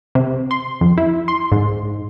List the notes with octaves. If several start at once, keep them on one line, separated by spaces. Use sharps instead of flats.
C3
C6
F2
E4
C6
G#2